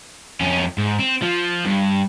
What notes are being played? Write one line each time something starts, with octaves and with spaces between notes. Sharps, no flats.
F2 C#4
G#2
C4
F3
G2